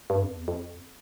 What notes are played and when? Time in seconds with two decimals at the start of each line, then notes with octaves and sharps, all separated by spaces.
0.10 G2
0.23 F2
0.36 E2
0.48 F2